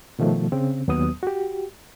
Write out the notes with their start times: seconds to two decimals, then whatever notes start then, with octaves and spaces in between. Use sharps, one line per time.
0.19 B2 D#3 F3 A3
0.52 C#3 C4
0.88 D#2 F#3 B3 D#6
1.23 F#4 G4